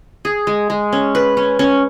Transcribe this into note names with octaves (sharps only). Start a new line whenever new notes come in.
G#4
G#3
G#3
C#4
B4
C#4
C#4